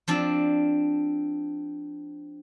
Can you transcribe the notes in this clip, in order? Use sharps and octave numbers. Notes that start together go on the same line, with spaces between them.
F3 C4 D4